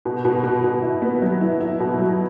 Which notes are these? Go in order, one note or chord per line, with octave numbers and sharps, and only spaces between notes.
B2
B2
B2
B2
E4
B3
F#3
E4
E4
B2
F#3